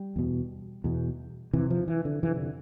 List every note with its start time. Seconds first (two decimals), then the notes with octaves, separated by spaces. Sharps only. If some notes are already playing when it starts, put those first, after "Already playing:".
Already playing: G3
0.16 E2 B2
0.84 E2 B2
1.53 F2 C3 E3
1.70 F3
1.88 E3
2.05 D3
2.22 F2 C3 E3
2.36 D3